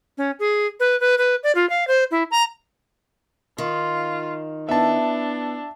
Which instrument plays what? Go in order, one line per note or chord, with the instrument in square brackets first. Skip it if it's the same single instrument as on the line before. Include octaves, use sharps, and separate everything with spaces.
[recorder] C#4
G#4
B4
B4
B4
D5
F4
F5
C5
E4
A#5
[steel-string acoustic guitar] D#3 [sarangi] F4
[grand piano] B3 E4 [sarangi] D4 [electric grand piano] E5 A5